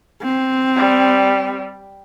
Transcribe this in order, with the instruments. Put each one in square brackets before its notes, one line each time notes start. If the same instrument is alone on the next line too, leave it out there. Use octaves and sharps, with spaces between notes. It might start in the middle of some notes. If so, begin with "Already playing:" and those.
[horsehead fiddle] C4
[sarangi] G3